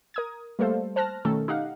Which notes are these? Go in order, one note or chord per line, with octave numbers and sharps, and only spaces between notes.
A#4 D#6 G#6
G3 A3 A#3 A4 C5 F5
C5 A5 F6 F#6 A#6
B2 D#3 A3 C#4 A4
D#4 G4 F5 F#5